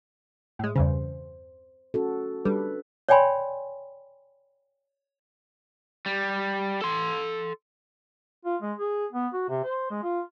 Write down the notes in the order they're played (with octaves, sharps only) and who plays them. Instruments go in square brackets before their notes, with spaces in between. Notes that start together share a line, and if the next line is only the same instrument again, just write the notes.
[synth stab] A2 G#3
[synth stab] E2 G2 C#3 [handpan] C5
[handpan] C#4 F#4 A4
[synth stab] G3 [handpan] D4 A4 B4
[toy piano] C#5 D5 G5 G#5 B5 C6
[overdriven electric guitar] G3
A4 C6
[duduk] F4
G#3
G#4
B3
F#4
C3
C5
G#3
F4